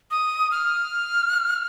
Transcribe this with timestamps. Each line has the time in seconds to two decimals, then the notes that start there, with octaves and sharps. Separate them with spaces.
0.11 D#6
0.51 F6